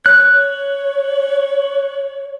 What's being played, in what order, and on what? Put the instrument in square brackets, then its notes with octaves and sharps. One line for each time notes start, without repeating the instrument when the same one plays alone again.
[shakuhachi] C#5 [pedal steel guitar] F#6